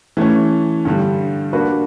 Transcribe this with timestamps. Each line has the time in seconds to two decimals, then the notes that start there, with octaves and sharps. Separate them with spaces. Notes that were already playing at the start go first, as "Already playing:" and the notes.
0.17 E3 A3 C#4
0.85 G2 D3 G3
1.53 A#3 D4 F#4 B4